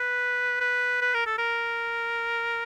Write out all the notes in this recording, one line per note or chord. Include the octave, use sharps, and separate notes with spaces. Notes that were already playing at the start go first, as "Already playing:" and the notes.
Already playing: B4
B4
B4
A#4
A4
A#4